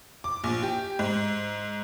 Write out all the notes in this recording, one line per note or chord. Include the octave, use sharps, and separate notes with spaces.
D6
A#1
G4
G#2